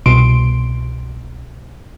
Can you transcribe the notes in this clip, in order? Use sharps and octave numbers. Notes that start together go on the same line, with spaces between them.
C2 B2 C6 D7